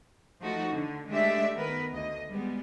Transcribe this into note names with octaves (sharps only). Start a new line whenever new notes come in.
F3 A3 D#4 F#4
D3
G#3 A3 D4 G4 D5 E5
D#3 B3 A#4 B4
D2 D#5
G3 G#3 B3